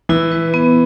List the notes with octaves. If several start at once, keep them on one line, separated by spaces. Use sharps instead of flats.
E3 E4
B4
B3